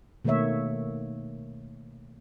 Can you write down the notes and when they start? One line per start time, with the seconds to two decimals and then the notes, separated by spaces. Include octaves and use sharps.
0.25 B2 D#3 A3 A#3 C#5 E5